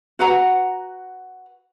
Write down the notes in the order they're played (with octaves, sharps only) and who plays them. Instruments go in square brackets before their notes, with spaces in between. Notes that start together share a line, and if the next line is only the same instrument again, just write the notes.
[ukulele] F#4 B4 F#5 A#5